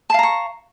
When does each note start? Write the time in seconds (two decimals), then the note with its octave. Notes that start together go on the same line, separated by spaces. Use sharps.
0.10 A5
0.14 F5
0.19 A#5
0.23 C#6